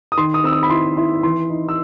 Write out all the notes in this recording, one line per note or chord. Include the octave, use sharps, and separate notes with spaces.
D#6
D#3 C6
D#6
C4 E6
D#6
B5
E4 C6
E4 C6
E3 C6
D#4
E6